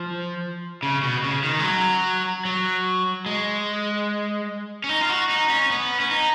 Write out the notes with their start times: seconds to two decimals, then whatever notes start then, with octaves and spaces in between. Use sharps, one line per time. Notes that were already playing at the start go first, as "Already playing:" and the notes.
Already playing: F3
0.83 C#3
1.03 B2
1.24 C#3
1.43 D#3
1.59 G#3
1.64 F#3
2.45 F#3
3.26 G#3
4.84 C#4
4.89 D#4
5.01 F4
5.09 F#4
5.29 D#4
5.50 C#4
5.70 B3
6.00 C#4
6.11 D#4